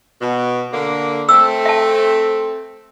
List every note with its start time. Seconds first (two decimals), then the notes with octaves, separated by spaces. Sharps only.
0.21 B2
0.73 D3 A#3
1.29 A3 C4 E6
1.66 E5 A5